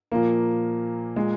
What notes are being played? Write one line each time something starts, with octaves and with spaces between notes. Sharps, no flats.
A#2 F3 A#3
A#2 G#3